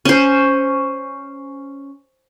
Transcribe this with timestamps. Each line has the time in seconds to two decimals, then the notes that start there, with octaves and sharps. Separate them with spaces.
0.05 C#4 C5